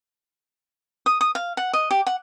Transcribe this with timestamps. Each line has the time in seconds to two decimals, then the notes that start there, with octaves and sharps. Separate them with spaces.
1.06 D#6
1.21 D#6
1.35 F5
1.57 F#5
1.73 D#5
1.91 G4
2.06 F#5